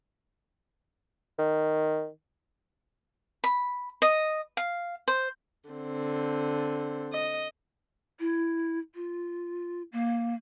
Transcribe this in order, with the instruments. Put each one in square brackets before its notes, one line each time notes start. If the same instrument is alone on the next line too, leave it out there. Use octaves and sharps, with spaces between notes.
[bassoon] D#3
[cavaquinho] B5
D#5
F5
C5
[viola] D3 C4
D#5
[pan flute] E4
F4
A#3